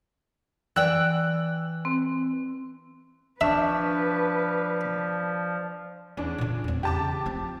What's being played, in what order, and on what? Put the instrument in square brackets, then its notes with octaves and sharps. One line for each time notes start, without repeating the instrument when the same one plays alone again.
[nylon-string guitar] E3 D5 G5 [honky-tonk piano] E6 F#6
[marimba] C4
[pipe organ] F3 [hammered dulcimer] D4 C#6 [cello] B4 [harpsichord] E5
[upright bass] E2 [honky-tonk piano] C#4 D4
[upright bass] A#2 D3
E2 C4
[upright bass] E2 C#3 [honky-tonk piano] G4 A5 D6
[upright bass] F3 C4